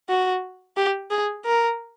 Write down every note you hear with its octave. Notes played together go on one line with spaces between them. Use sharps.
F#4
G4
G#4
A#4